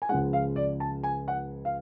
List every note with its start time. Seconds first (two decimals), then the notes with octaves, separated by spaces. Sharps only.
0.02 G#5
0.09 C#2 C#3 F3 G#3 F#5
0.33 F5
0.56 D5
0.80 A5
1.03 G#5
1.28 F#5
1.65 F5